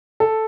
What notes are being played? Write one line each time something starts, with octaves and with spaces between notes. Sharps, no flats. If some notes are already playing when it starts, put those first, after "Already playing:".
A4